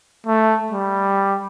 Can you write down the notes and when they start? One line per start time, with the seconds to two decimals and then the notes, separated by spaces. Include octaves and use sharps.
0.26 A3
0.72 G3